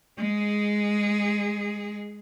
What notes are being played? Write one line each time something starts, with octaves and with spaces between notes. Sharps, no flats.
G#3 G#4